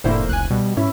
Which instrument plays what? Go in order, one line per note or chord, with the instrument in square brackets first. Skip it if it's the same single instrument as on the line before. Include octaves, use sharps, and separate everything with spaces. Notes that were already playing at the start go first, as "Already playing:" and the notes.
[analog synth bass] F1 [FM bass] A2 [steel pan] D3 E4 [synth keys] A#3 C5
[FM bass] C#2 [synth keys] G#5 F#6
[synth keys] B2 [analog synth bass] G3
[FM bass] G#2 [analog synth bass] C#4 [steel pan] E4